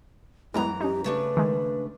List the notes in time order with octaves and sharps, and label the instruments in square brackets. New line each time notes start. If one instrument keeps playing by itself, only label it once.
[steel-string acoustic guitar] F#2 E3 A#5 [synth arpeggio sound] G3 G#3 B3 [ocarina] E4
[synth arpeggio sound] C#4 D#4 [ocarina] G4
[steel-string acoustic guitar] C#3 A3 D4 [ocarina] B4
[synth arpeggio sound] D#3 G#3